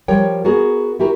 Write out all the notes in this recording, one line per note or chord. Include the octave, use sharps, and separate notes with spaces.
F3 G3 A#4 C#5 G5
B3 F#4 G#4 A#4
E4 F#4 G4 A#4